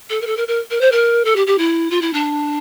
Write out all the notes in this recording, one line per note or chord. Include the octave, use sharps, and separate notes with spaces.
A4
A#4
A4
A#4
A#4
A#4
C5
A#4
A4
G4
G4
E4
F4
E4
D4